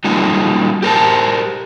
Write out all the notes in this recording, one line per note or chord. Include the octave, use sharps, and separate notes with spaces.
F#3 G3 A#3 C#4 D#4 F4
G4 A#4 C5 A5